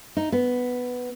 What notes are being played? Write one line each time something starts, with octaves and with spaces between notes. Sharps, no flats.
D#4
B3